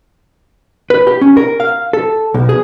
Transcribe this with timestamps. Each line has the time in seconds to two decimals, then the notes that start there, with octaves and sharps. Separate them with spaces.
0.90 B4
1.07 G4
1.21 C#4
1.37 A#4
1.60 F5
1.93 A4
2.34 B1
2.49 G#4